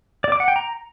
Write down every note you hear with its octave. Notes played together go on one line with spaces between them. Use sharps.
D5
D6
F#5
G5
A#5